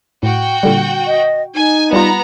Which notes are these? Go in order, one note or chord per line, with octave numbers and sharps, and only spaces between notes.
A2 F#4 G5
A#2 D3 G3
D#5
D#4 G#5
G3 B3 F4 A#5